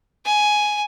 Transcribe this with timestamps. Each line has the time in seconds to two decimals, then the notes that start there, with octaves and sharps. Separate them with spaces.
0.25 G#5